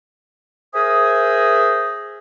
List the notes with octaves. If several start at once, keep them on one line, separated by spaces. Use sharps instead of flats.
G#4 A#4 C5 E5 G#5 D#6